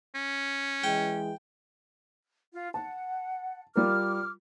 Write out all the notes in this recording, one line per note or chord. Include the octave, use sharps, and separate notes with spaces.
C#4
E3 G#3 G5
F4
F#5 A5
G3 F4 A#4 D6 F6